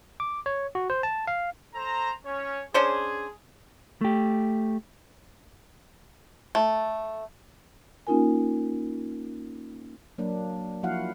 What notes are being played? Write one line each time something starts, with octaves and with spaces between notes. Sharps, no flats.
D6
C#5
F#4
C5
A5
F5
A4 C5 A#5
C#4 C#5
C#4 D4 G#4 C5
A3 G4
A3
A#3 C#4 D#4 F4 A#4 G#5
F#3 A#3 D4
F3 A#3 E4 F#4 F5 F#5